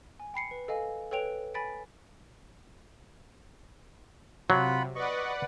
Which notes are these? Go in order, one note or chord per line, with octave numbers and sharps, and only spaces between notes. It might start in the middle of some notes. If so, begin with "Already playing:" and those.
G#5
G5 B5 C7 C#7
B4
A4 D#5 F5 G#5
A4 B4 C#5 G5 D7 F7
G#5 B5 A6 B6 D7
C3 F#3 F4 F#5 B5
B4 D5 D#5 F#5 C#6